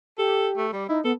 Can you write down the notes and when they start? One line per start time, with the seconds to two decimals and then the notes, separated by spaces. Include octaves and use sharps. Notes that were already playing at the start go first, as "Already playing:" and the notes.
0.18 G4 A4
0.57 A3
0.73 G3 D5
0.89 D#4 E4
1.04 B3 A4